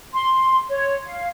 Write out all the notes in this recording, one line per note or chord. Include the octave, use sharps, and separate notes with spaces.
C6
C#5
F5